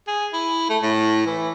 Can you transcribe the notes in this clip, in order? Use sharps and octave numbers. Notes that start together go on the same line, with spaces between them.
G#4
E4
A3
A2
E3